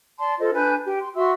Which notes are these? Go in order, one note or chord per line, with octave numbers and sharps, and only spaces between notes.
D5 A5 C6
F4 A4 C5 D#5
D4 B4 G#5 G6
G4
C6
F#4 E5 C6 E6